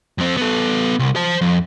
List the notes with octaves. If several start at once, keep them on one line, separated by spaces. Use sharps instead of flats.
F2 C4
B3 A4
C2
C5 A5
F2